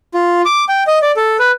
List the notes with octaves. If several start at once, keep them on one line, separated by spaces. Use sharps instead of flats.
F4
D6
G5
D#5
D5
A4
B4